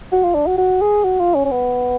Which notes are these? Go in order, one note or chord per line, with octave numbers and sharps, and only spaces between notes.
F#4
F4
D4
F#4
F#4
G#4
F#4
F4
C#4
C#4
B3